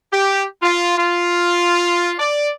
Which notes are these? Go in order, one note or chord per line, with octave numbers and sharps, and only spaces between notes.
G4
F4
F4
D5